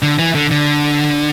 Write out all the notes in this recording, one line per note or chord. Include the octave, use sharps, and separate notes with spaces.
D3
E3
D3
D3